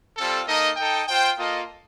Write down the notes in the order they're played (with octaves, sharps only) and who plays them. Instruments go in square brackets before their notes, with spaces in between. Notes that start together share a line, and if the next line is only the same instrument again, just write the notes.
[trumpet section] G3 C4 F4 A4
A#3 D#4 A4 D#5
D#4 A4 D#5 G5
F4 C5 G5
A#3 F4 A4 D#5